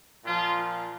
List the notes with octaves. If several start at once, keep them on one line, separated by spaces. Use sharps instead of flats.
A#2 F3 F4